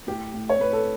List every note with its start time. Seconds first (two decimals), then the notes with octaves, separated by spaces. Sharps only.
0.07 A2 G4
0.34 A2
0.49 C#5
0.59 A2 B4
0.73 A4